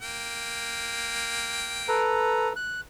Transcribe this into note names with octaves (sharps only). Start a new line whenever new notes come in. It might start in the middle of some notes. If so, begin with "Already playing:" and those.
A#3 G5
A4 B4 A#5
F#6